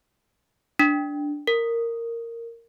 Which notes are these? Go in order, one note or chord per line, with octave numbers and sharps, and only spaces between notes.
D4
A#4